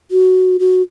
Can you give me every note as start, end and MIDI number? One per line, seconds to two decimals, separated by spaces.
0.11 0.57 66
0.59 0.82 66